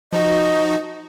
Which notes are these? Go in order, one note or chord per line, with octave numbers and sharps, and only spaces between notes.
F3 D#4 F#4 D#5